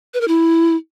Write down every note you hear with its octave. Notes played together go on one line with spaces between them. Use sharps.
B4
A#4
E4